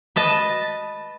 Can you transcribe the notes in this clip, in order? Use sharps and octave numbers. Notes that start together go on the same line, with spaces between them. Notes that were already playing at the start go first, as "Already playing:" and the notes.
B4 D#5 A5